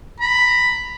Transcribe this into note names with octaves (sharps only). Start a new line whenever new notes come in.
A#5 B5